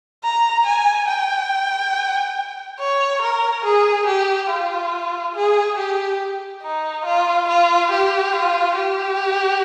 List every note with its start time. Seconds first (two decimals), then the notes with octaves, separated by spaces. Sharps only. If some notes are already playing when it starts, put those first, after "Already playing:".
0.24 A#5
0.66 G#5
1.08 G5
2.79 C#5
3.22 A#4
3.65 G#4
4.06 G4
4.49 F4
5.35 G#4
5.78 G4
6.62 D#4
7.05 F4
7.48 F4
7.91 G4
8.33 F4
8.76 G4